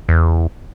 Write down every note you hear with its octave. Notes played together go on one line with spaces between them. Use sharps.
E2